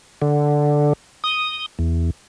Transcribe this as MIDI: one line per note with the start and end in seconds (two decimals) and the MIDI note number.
0.22 0.93 50
1.24 1.66 87
1.79 2.10 40